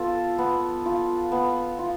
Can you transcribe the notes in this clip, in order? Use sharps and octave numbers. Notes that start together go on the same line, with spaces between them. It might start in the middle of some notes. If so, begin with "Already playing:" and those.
Already playing: B3 F4 A4
B3
F4
B3
F4